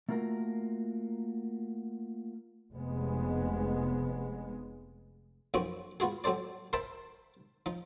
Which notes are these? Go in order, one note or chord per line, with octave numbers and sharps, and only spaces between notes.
A3 A#3 F4 F#4 A#4
F1 G#3 B3
B1 F#2 F3 C4 F#4
B3 F4 F#4 G#4
F#3 C4 A4 C5 D5
A#4 C5 E5 G5 A5 B5
F3 D#4